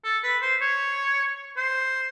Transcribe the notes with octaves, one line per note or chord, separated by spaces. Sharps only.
A4
B4
C5
C#5
C5